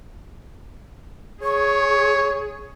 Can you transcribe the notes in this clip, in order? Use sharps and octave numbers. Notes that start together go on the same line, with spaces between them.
G#4 C#5 C#6